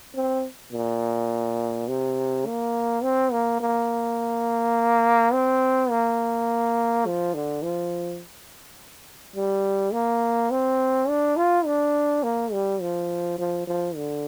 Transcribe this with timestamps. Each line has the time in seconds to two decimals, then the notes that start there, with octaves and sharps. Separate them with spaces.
0.16 C4
0.72 A#2
1.88 C3
2.46 A#3
3.03 C4
3.32 A#3
3.60 A#3
5.33 C4
5.90 A#3
7.06 F3
7.34 D3
7.63 F3
9.36 G3
9.93 A#3
10.51 C4
11.08 D4
11.37 F4
11.65 D4
12.23 A#3
12.53 G3
12.81 F3
13.38 F3
13.67 F3
13.96 D3